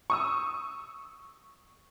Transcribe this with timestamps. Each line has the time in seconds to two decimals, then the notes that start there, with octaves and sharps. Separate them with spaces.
0.10 C#6 D#6 E6